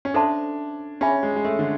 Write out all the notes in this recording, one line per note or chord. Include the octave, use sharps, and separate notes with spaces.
C#4
D4 A4 C5 E5 A5 C6
C#4 G#4 C#5 E5 G#5 B5
G#3
G#3
A3
D3